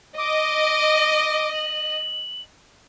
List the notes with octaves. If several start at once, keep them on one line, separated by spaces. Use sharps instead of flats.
D#5 D6
F#7